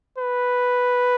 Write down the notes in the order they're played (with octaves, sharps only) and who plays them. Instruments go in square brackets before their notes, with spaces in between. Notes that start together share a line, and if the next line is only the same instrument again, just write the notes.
[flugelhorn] B4